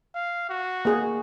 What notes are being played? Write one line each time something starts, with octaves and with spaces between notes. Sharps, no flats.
F5
F#4
A#3 G#4